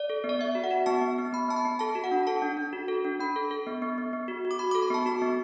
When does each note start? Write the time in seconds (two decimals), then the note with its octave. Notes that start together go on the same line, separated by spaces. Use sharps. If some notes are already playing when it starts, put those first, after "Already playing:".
Already playing: D5
0.10 A4
0.24 B3
0.29 D5
0.39 B3 E5
0.55 F#4
0.64 F#5
0.71 F#4
0.86 B3 A5
1.02 B3
1.18 B3
1.33 B3 B5
1.48 B3 A5
1.56 B5
1.65 B3
1.79 A4 A5
1.95 F#4
2.04 F#5
2.11 D4
2.27 A4 A5
2.42 D4
2.57 D4
2.73 F#4
2.88 A4
3.04 D4
3.20 D4 B5
3.36 A4
3.51 A4
3.67 B3
3.82 B3
3.98 B3
4.13 B3
4.28 F#4
4.45 F#4
4.51 D6
4.59 F#4 B5
4.71 A4 D6
4.83 B5
4.90 B3 A5
5.06 F#4 A5
5.22 B3